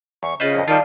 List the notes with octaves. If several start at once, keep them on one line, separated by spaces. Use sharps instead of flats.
E2 C#6
C#3 F4 B4 C5 D#5
A#1 F2
D#3 G3 F4 D5 F5 A5